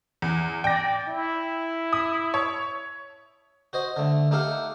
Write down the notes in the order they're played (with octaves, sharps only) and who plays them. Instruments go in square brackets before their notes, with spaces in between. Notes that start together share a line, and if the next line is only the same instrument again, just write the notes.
[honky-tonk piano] E2
[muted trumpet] D5 [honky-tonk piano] G5 A#6
[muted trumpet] E4
[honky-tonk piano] D#6
C#5
[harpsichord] F#4 C5 D#5
D3 A3
A3 D#4 G4 A4 F5 F#5